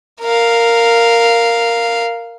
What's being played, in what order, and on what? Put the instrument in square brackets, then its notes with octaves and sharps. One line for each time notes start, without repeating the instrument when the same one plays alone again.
[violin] A#4 F5